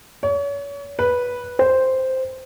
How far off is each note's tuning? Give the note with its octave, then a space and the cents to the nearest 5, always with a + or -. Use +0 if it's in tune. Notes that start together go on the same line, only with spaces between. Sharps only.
C#5 +35
B4 -10
C5 -5